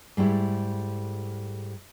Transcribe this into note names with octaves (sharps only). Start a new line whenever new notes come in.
G#2 G3 A3 E4